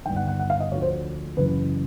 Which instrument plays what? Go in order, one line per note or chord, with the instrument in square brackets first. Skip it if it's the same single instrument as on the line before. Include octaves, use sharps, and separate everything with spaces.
[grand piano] G1 G2 D#3 G5
F#5
F#5
F#5
F5
D#5
D2 D3 F3 C#5
C5
F#1 F#2 C#3 E3 B4